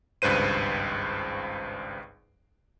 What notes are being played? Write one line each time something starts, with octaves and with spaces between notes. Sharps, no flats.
G#1 C#2 G2 B4 C5 D#7